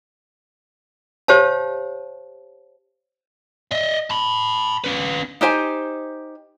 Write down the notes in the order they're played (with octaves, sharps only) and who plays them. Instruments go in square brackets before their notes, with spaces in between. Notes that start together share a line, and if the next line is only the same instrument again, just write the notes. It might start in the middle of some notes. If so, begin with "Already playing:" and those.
[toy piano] G4 C5 C#5 F5 A5
[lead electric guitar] D#5 E5
A5 B5
C#4 B4
[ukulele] D#4 G4 C5 G#5